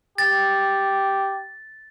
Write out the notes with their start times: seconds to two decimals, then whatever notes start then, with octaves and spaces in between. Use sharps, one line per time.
0.18 G4 A6